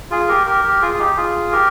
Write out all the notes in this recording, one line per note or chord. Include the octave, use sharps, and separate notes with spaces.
F4 G#4
G4 A#4
G4 A#4
G4 A#4
F4 G#4
F4
D#4 G4
F4 G#4
G4 A#4